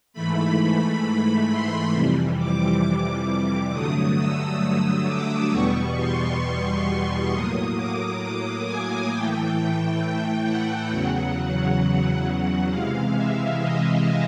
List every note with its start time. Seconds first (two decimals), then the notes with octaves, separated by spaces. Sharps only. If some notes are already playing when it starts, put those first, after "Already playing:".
0.13 G#2 E3 A3 B5
1.49 C6
1.93 F2 C3 E3 G3
2.38 D6
3.72 G2 D3 F#3 A3 D#6
4.17 E6
4.62 D#6
5.07 D6
5.52 E2 B2 G3 B3 C#6
5.97 C6
7.31 A2 F#3 A#3 D#6
7.76 D6
8.21 D6
8.66 G#5
9.11 A2 E3 A3 G5
10.46 F#5
10.90 E2 C#3 F#3 F#5
12.25 F#5
12.70 C3 E3 G#3 F5
13.15 E5
13.60 D#5